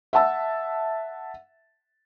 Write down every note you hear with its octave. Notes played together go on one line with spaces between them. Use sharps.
E5 F#5 A5 E6